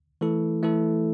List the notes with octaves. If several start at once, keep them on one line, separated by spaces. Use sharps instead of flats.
E3 A3 E4 A4
E3 A3 E4 A4